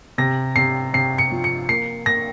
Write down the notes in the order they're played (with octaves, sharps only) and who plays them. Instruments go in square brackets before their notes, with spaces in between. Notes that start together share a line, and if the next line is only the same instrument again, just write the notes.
[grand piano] C3 [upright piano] A#6
[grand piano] C3 [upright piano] C7
[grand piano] C3 [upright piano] C7
[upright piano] C#7
[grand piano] F3
[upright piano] C#7
[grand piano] A#3 [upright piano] C7
[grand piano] A#3 [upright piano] A#6